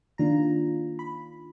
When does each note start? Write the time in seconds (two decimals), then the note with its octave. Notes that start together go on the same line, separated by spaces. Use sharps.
0.18 D#3 A#3 D4 F4 A#5
0.99 B5